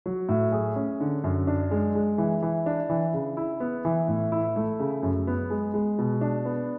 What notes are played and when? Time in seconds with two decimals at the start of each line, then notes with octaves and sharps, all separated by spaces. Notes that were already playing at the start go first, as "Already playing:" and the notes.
0.06 F#3
0.29 A2
0.52 G#4
0.76 C#4
1.00 D3
1.24 F#2
1.47 D4
1.71 G#3
1.95 G#3
2.18 E3
2.42 E3
2.66 D4
2.90 E3
3.14 C#3
3.37 E4
3.60 B3
3.85 E3
4.08 A2
4.32 E4
4.56 A3
4.79 C#3
5.03 F#2
5.27 B3
5.50 G#3
5.74 G#3
5.98 B2
6.21 D4
6.45 B3